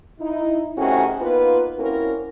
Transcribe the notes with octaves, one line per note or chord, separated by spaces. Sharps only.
D#4 E4
A2 C3 D#3 C#4 F#4 G#4
A#3 B3 D#4 F4 B4
A#3 C4 C#4 E4 F#4 A#4